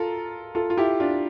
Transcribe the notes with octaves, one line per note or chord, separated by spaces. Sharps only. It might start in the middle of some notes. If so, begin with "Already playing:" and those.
Already playing: F4 A4 A#4
F4 A4
F4
E4 G4
D4 F4